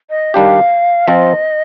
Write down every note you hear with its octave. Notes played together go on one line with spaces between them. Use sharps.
D#5
D#3 G3 D4 G4 F5
F3 C4 F4 D#5